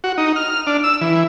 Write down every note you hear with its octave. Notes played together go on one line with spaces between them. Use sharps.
F#4
D#4
F6
D4
E6
E3